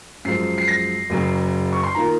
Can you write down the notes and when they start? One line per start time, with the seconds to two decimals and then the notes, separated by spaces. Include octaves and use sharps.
0.25 F#2 F3 G#3 C7
0.58 C7
0.68 A#6
1.10 F#1 F#2 C#3
1.73 C#6
1.83 C6
1.95 D#3 A#3 F4 A#5